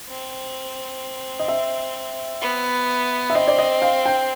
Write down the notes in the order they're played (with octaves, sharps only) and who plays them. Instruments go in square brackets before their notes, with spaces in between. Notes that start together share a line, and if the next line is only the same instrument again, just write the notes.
[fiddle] C4
[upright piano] D#5
E5
[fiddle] B3
[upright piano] E5
[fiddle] C4 [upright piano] D#5
[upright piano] D5
D#5
F5
G5